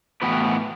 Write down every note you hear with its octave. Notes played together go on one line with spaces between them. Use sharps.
A2 E3 B3 F#4 B4